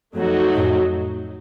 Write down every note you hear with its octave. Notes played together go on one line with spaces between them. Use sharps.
F2 F#3 A3 D#4 F#4
F2 A2